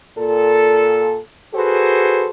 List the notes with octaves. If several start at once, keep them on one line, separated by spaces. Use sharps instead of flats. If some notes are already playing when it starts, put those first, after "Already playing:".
A#2 A4
F#4 G#4 A4 B4 C5